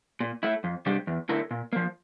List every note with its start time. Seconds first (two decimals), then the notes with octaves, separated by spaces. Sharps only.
0.20 A#2
0.43 A3 E4
0.64 F2
0.86 C3 G3 D4 G4
1.07 E2
1.29 D3 A3 E4 A#4
1.51 A#2
1.73 F3 A#3